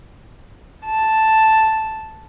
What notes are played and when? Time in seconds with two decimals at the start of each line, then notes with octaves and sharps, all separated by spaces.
0.86 A5